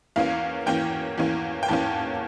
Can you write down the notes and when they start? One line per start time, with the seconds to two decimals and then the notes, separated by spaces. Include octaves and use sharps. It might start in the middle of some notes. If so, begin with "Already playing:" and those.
0.16 E2 E3 A#3 C#4 F5
0.66 E2 E3 A#3 C#4 G5
1.18 E2 E3 A#3 C#4
1.63 G5
1.68 E2 E3 A#3 C#4 A5